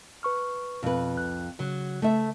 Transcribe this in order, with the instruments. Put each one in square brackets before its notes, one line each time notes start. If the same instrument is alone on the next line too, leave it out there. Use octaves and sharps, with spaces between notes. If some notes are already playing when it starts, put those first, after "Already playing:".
[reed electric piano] B4 C#6 F6
[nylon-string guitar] F2 B4 [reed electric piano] B2
[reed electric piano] C2 F#6
[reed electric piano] C#3 [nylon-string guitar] F#3
[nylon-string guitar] A3 E5